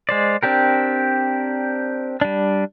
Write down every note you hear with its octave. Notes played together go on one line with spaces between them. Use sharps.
G#3 C5 D5
C4 D4 G4 A#4
G3 D4